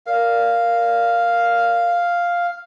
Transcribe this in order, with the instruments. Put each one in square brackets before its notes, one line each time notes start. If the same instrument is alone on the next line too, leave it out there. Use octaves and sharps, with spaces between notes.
[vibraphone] A#4 D5 [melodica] F5